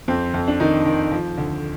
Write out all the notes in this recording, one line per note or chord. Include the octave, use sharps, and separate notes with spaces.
F2 C4
F2
D4
D#3 D#4
D#3
F3
D2